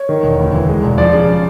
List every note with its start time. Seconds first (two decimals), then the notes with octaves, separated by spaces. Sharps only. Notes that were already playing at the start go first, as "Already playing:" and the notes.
Already playing: C#5
0.09 D#3
0.23 E1
0.39 D2
0.54 E3
0.68 G#3
0.83 E1
0.98 F3 D5
1.13 C#3